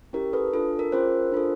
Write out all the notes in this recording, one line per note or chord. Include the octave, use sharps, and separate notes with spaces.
C#4 E4 G4 A#4
A4 B4
D4 F4 A4
A#4
C#4 F4 G#4 A#4 C5
D4 F4 A4